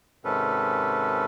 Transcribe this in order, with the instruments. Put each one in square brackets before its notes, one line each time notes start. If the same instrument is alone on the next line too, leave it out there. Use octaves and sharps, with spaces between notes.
[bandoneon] G#2 C3 D#3 C#4 A4 B4